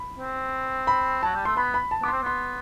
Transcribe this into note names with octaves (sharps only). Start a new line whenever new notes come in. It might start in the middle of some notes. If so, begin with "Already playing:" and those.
Already playing: B5
C4
B5
F#3 A5
G3
A3 C6
B3 B5
B5
A5
B3 D6
C4 C6
B3 C6